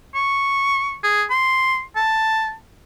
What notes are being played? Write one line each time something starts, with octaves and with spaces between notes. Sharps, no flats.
C#6
G#4
C6
A5